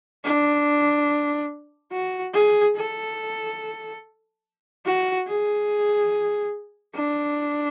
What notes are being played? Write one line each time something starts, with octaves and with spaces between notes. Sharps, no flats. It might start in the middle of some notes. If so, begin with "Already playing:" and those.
D4
F#4
G#4
A4
F#4
G#4
D4